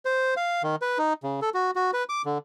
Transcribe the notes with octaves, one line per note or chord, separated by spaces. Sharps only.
C5
F5
D#3
B4
D#4
C#3
A4
F#4
F#4
B4
D6
D3